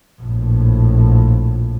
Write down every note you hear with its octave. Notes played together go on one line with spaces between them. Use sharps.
A#1 A2